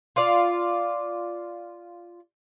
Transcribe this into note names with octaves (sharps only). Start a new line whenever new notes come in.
F4 D5